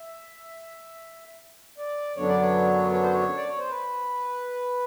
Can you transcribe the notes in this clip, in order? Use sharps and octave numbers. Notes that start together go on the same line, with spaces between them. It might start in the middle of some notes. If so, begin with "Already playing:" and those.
Already playing: E5
D5
F#2 D3 F#3 B3 D4 C#5
D5
C#5
C#5
C5
C#5
D5
C#5
C5
B4